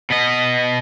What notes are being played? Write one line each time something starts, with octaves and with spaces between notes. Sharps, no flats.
B2 D#5